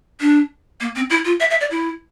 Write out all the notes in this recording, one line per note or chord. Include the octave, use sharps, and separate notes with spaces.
D4
A#3
C4
E4
F4
E5
E5
D5
E4